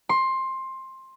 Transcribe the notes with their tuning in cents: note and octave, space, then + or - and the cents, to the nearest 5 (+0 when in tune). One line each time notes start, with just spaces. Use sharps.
C6 +15